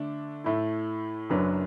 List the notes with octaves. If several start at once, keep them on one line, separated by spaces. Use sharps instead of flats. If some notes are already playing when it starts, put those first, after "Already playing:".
Already playing: D3 A3 D4
A2 A3 E4
F#1 F#2 F#3 D4 B4